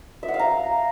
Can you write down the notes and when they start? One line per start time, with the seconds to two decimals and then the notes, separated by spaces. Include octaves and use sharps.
0.23 E5
0.28 F#5
0.34 F5
0.39 A#5